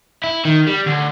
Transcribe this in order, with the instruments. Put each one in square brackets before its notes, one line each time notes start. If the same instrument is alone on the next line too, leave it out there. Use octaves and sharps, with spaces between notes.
[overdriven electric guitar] E4
D#3
G3
D2